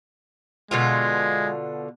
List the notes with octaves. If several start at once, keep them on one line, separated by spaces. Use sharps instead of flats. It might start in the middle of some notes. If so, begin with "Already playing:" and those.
B2 D3 G#3 F4